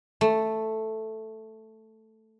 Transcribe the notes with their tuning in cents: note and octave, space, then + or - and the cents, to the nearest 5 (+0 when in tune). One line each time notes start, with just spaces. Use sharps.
A3 +0